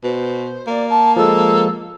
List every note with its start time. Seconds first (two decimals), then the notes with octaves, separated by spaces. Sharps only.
0.03 B2 C5
0.67 A#3 D5
0.89 A5
1.16 F3 G#3 A4